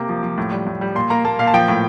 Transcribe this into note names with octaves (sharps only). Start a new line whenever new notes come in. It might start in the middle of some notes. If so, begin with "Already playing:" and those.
Already playing: C3 A#3 D6
F3
F3
A2
G3
A2
G3
A#2 C6
A#3 A#5
A#3 A5
A#2 F5
A5
F3 G5
A2